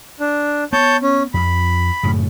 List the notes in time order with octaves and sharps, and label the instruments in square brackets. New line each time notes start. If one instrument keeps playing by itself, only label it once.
[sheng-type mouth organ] D4
[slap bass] B3 [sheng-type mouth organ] C#5 A5 G6
[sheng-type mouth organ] C#4
[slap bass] F2 [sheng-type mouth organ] B5
[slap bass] F#2 A2 C#3